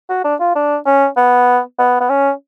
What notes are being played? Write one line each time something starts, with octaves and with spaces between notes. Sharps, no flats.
F#4
D4
F4
D4
C#4
B3
B3
B3
C#4